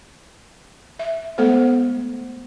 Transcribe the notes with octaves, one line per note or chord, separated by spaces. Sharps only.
E5
G#3 A3 B3 A4 C5